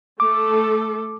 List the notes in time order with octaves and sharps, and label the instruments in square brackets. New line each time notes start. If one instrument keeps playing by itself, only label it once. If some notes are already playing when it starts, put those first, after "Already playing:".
[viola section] A3 A4 [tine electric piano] D6